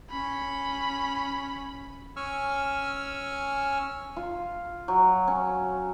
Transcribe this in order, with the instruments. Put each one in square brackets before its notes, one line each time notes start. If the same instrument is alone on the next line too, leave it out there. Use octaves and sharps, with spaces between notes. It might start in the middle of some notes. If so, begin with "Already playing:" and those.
[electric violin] C#4 B5
[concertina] C#4 G#5 C#6 E6 F6
[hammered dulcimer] F4
F#3
C#4